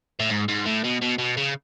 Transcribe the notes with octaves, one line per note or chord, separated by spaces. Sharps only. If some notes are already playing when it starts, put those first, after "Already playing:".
A2
G#2
G#2
A2
B2
B2
B2
C#3